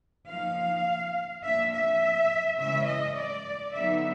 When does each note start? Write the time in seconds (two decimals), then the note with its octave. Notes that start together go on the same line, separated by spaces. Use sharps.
0.28 F3 A#3 D#4 F5
1.44 F3 A#3 D4 E5
1.73 E5
2.58 C#3 E3 G#3 C#4 E5
2.87 D#5
3.16 D5
3.73 D3 F#3 B3 D#4 E5